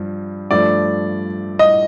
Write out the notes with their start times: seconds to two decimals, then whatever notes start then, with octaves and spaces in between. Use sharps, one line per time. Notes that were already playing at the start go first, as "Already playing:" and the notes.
Already playing: G2 F3
0.51 G2 F3 A3 D5
1.59 D#5